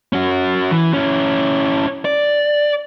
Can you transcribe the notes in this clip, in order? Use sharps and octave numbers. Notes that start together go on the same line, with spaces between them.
C#4 F#4
E3
C#4 E4
D5